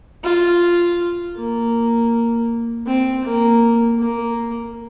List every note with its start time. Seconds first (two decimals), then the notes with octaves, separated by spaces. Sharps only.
0.24 F4
1.37 A#3
2.87 C4
3.24 A#3
3.99 A#3